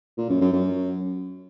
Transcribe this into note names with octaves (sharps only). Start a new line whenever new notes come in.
A#2
F#2
F#2
F#2